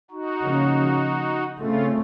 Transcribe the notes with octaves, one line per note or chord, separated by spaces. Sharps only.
D#4 F#4
C#3 F3 A#3 C#4
C#3 A3 C4 C#4 F4